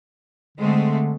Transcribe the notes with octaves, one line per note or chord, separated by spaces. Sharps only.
D3 G#3 A3 C4